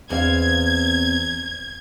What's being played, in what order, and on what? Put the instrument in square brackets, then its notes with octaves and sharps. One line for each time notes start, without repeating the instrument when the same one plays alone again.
[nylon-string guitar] E2 C4 F5 [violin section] G#6